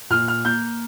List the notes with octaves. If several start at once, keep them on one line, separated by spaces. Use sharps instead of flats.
A#2 F6
F6
A#3 G6